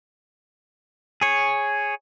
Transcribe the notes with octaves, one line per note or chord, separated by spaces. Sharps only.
G#4 C#5